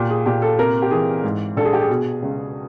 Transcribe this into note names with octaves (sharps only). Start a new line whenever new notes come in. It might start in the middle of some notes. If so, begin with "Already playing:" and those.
Already playing: A#2 G4
G#4
A#2 G4
A4
C3 A#4
G4
E3 G#4
G#2
A#1 A4
G#4
G4
G#4
B2
C#2